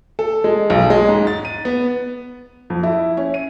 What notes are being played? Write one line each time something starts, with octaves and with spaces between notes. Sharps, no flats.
A4
G#3
B1
G#3
G#2
A6
D#7
B3
F2
E4
C#4
D#7